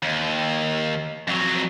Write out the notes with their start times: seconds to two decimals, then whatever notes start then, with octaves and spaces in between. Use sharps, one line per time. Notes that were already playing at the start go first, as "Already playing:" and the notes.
0.02 D#2
1.28 F2 F#3